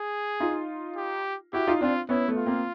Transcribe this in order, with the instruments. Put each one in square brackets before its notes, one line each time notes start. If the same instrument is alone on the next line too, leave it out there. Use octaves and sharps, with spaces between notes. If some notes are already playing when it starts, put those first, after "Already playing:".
Already playing: [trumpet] G#4
[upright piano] D#4 F4
[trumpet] G4
[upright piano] E4 F#4 [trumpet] G4
[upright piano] D#4 F4
[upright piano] C4 D4 [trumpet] F4
[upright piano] B3 C#4 [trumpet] E4
[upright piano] A3 B3
[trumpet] F4
[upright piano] A#3 C4